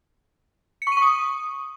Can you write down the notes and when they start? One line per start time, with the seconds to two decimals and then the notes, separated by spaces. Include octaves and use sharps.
0.82 C#7
0.87 C#6
0.92 D#7
0.97 C#6
1.02 D#6